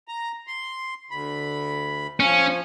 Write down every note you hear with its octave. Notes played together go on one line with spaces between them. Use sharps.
A#5
C6
D2 B5
F3 C#4